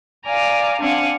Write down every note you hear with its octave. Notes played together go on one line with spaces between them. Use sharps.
D5 F5 G#5 A#5
C4 D4 F5 F#5 G#5